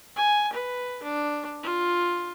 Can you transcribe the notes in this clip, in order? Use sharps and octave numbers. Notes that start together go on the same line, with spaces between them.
G#5
B4
D4
F4